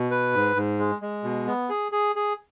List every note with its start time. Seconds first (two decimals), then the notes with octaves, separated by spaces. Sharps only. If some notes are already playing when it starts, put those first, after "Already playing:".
Already playing: B2
0.11 B4
0.34 G#2
0.56 G#2
0.79 G#3
1.02 G#3
1.24 B2
1.47 B3
1.69 G#4
1.92 G#4
2.16 G#4